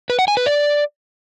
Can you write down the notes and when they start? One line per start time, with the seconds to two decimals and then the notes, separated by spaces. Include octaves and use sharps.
0.10 B4
0.19 F#5
0.28 G#5
0.37 B4
0.46 D5